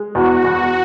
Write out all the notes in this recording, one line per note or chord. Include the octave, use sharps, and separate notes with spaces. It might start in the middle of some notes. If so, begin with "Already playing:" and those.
Already playing: G#3
E2 F#4
E2